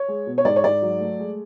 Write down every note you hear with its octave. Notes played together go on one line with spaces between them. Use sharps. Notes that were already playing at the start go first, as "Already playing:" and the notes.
Already playing: C#5
G#3
B2
C#5
G#2 D5
C#5
G#2 D5
F#3
A3
G#3